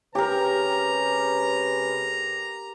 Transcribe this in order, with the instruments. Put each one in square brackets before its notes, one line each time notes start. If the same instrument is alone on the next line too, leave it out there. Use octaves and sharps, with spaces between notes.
[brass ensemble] C3 G#3 B4 [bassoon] C#4 [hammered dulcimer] G4 A#4 [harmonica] A#5